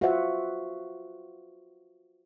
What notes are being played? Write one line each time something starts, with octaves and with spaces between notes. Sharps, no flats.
F4 F#4 B4 C5 E5 F#5